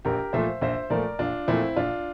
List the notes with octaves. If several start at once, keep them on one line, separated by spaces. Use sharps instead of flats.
A#1 G4 A#4
A#2 F3 A3 C5 E5
A#1 C5 E5
A#2 F3 A3 A#4 D5
A#1 D4 F4
A#2 F3 A3 C4 E4
A#1 D4 F4